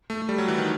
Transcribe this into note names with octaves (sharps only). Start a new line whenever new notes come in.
A3
A3
G3
F#3
E3
D#3